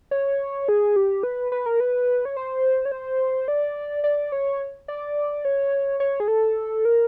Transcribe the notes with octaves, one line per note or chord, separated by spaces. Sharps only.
C#5
G#4
G4
B4
B4
A#4
B4
C#5
C5
C#5
C5
D5
D5
C#5
D5
C#5
C#5
G#4
A4
A#4